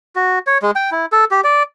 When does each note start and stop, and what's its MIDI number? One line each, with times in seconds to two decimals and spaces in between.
0.16 0.39 66
0.47 0.58 73
0.62 0.71 56
0.76 0.90 79
0.91 1.06 64
1.12 1.25 69
1.31 1.41 67
1.44 1.63 74